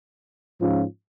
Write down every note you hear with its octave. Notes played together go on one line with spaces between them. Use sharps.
G#2 F3 C#4 F4